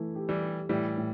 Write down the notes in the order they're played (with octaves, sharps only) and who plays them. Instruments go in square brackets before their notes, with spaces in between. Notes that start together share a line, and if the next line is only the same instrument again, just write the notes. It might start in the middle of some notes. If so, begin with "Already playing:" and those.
Already playing: [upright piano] E3 A3 E4
G4
[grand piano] E3 G3
[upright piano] G4
[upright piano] A2 [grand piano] E3 G3
[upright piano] A2